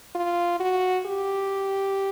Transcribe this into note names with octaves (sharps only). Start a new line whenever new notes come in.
F4
F#4
G4